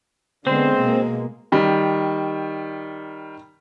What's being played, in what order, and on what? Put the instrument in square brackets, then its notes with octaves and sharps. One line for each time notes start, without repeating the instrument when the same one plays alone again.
[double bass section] D3 B3 [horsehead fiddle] G#3 [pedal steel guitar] C4 [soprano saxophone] C5
[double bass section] B2 A#3
[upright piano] D#3 G3